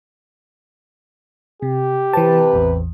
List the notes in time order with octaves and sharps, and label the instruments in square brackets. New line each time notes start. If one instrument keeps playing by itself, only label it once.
[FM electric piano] C3 [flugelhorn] G4
[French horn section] C3 B4 [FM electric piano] E3 A5
[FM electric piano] A1 E2